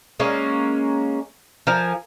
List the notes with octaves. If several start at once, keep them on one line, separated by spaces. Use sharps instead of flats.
G#3 A#3 C#4
F3 A#4 G#5